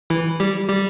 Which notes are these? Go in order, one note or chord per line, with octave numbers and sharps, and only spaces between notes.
E3 E4
G3 G4
G3 G4